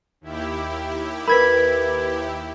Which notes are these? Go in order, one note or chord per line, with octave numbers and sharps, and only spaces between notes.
D#2 E4 G4
A#4 B4 B5 G#6 B6